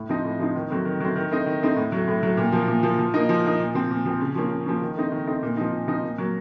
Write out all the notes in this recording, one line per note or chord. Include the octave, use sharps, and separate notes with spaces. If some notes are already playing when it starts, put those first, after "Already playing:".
Already playing: A2
F3 C4 D#4
A2
F3 C4 D#4
D#3
F#3 A3 C4
D#3
F#3 A3 C4
D#3
A3 C4 D#4
D#3
A3 C4 D#4
A2
F#3 A3
A2
F#3 A3
A#2
F3 A#3
A#2
F3 A#3
F3
A#3 D#4
F3
A#3 D#4
A#2
F3 C4
A#2
F3 C4
C#3
F3 A#3 C#4
C#3
F3 A#3 C#4
D#3
A3 C4 D#4
D#3
A3 C4 D#4
A#2
F3 C4 D#4
A#2
F3 C4 D#4
A#2
F#3 A#3